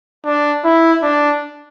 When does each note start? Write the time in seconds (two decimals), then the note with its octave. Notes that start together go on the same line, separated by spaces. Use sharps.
0.25 D4
0.64 E4
1.03 D4